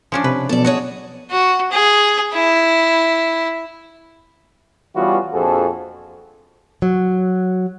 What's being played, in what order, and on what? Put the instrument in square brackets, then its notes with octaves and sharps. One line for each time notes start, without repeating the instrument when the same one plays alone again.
[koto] F3 C#4 D4
[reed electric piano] C3 [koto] B4
[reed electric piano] B2 F3 [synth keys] F#3 B3 E7 [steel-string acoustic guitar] A4 D5
[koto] F#4 [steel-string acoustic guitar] G#4 C#5 D#5
[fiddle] F#4
G#4
E4
[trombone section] E3 G3 B3 C#4 F4 F#4
A#1 F2 F#4 G#4 A4
[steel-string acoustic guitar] F#3